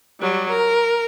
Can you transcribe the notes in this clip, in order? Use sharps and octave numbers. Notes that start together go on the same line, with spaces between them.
F#3 G3
A#4